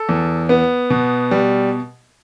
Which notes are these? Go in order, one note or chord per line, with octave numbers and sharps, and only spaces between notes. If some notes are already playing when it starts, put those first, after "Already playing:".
Already playing: A4
E2
B3
B2
G3